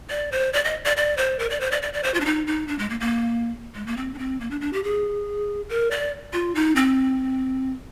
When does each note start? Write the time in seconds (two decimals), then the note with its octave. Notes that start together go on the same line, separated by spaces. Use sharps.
0.10 D5
0.32 C5
0.53 D5
0.65 D#5
0.86 D5
0.97 D5
1.17 C5
1.39 A#4
1.50 D5
1.61 C5
1.72 D5
1.82 D5
1.93 D5
2.03 C5
2.14 F4
2.20 D4
2.25 D#4
2.47 D#4
2.68 D4
2.79 G#3
2.90 A#3
3.00 A#3
3.75 G#3
3.87 A#3
3.97 C4
4.14 D4
4.18 C4
4.40 A#3
4.51 D4
4.61 D4
4.73 G4
4.84 G#4
5.69 A#4
5.91 D5
6.33 F4
6.55 D#4
6.76 C4